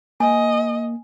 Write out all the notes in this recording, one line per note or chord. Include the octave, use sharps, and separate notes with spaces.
A#3 D#5 G#5